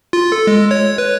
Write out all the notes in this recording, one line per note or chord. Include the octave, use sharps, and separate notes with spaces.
F4
A4
G#3
C#5
B4